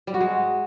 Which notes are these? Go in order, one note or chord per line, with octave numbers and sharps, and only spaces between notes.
G3
F#4
G#3